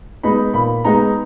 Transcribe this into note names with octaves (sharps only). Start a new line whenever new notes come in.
G#3 B3 D#4 B5
A#2 B5
G#3 B3 D#4 A#5